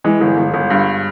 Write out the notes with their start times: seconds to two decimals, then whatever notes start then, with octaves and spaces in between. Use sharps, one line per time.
0.04 E3 G#3
0.21 G1
0.37 G1
0.54 G1
0.70 G2